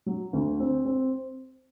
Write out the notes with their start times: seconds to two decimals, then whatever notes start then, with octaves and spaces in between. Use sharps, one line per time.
0.06 F#3
0.33 D2
0.60 C4
0.85 C4